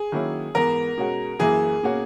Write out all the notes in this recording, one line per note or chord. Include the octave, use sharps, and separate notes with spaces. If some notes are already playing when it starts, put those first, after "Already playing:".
Already playing: G#4
D#3 F#3 A#3 C#4 E4
G#2 E3 B3 A#4
B2 G#3 C#4 F#4
F#2 E3 A#3 E4 G#4
B2 A#3 C#4 F#4